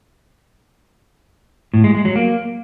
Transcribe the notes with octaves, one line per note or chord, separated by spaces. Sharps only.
A2
G#3
G#3
F#3
A#3